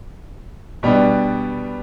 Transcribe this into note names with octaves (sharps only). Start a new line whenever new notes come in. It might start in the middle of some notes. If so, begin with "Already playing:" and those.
B2 G3 B3 D4